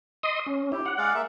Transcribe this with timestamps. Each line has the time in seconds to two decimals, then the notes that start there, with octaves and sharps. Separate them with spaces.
0.23 D#5 C6 D#6
0.46 C#4
0.72 E4 G4
0.86 F#5
0.98 G#3 D5 F5
1.14 A#3 E5